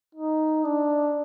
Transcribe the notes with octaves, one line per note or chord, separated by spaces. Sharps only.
D#4
D4